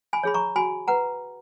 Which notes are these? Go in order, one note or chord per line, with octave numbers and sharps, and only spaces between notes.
G#5 B5
G#4 C#5 B5
A#5 C#6
F#4 G#5 B5
B4 F#5 A#5